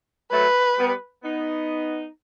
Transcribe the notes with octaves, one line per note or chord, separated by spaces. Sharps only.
F#3 A3 B4
G3 B3
B3 D#4